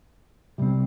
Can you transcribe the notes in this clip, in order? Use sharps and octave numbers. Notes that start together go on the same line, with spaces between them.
C3 G3 C4